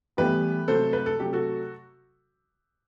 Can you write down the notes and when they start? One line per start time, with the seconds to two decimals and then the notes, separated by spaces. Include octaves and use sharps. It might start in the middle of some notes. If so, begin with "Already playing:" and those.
0.17 A2 E3 G3 B3 G4 B4
0.68 C3 F#3 A3 A4 C5
0.93 B4
1.06 A4
1.19 C3 F#3 A3 G4
1.33 F#4 A4